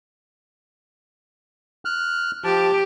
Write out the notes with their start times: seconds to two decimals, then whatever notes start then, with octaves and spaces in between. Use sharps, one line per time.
1.85 F6 F#6
2.44 F3 G4 A5